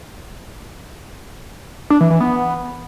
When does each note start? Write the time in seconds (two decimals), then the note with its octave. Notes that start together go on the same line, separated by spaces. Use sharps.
1.90 D4
2.00 E3
2.11 E3
2.21 B3